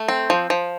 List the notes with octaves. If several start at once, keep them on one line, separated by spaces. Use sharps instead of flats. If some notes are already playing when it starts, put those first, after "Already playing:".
Already playing: A3
C4
F3
F3